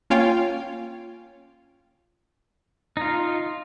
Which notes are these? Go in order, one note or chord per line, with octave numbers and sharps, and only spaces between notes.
A#3 C#4 F4 C#5 F5 G5
D#4 F4